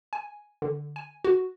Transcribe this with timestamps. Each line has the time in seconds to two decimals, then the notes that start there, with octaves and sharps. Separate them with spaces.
0.13 G#5
0.62 D3
0.96 G#5
1.25 F#4